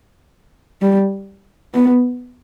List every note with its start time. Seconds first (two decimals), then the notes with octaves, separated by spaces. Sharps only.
0.82 G3
1.74 B3